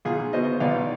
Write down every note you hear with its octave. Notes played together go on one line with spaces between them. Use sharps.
B1 F4 G#4
B2 C5 D#5
B1 D5 F5